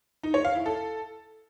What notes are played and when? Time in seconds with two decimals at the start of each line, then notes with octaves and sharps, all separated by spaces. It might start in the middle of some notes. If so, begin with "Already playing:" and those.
0.23 D#4
0.34 C#5
0.45 F5
0.55 E4
0.66 A4